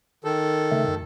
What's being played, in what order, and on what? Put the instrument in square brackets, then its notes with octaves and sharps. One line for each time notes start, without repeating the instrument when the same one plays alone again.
[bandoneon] D#3 A4
[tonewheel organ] C#3 A3
F#2